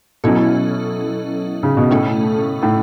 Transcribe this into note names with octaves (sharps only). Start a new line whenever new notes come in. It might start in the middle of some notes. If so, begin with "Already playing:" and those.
B2 F#3 C#4 E4 A4
C#3
B2
A2 A3 C#4 E4 A4
A2